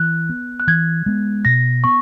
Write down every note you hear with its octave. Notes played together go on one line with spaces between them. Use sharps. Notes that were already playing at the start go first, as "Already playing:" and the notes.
Already playing: E3 F#6
B3
F#6
E3 G#6
G#3 B3
B2 A#6
B3 C#6